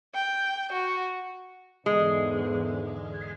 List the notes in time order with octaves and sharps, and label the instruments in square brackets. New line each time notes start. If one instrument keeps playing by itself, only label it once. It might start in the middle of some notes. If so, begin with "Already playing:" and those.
[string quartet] G5
F#4
[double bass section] E2 G#2 D3 [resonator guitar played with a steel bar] G#3